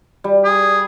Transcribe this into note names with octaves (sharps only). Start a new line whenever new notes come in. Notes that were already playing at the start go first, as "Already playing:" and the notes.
G3
G#4